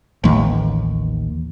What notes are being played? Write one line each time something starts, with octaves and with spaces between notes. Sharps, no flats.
A1 D#2